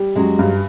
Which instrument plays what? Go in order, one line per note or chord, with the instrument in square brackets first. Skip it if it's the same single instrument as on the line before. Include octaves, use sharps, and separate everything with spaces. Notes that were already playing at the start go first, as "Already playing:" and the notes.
Already playing: [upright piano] G3
[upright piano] F#2 [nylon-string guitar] F#3 G#3
[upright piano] G2